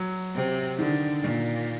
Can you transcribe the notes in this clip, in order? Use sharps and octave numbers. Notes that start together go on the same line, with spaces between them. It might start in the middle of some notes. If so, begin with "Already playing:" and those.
Already playing: F#3
C3
D3 D#3
A#2